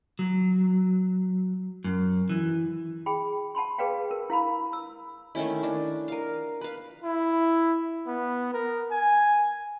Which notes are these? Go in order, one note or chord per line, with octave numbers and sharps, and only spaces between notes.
F#3
F#2
E3
G#4 G5 B5
F#5 A5 B5 C6
G#4 A4 B4 D5 F5 G5
A#4
E4 F5 A#5 B5
E6
D#3 A3 C#4 E4
D4
A#4 F5
B4 F5
E4
B3
A#4
G#5